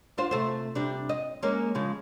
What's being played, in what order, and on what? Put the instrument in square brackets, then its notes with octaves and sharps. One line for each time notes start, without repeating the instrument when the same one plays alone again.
[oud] D4 F4 C5
C3 A3 C5
C3 G3 D4
D#5
G#3 A#3 C#4
C#3 F3 G#3